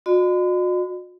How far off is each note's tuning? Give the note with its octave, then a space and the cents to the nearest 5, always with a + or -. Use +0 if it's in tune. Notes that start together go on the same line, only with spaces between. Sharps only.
F#4 -40 D#5 -45 B5 +45